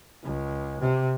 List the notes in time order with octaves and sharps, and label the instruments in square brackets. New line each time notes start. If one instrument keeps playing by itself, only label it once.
[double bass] C#2
C3